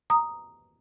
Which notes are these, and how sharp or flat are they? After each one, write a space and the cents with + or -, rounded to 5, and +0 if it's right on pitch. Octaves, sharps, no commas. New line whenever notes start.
A#5 +0 D#6 +0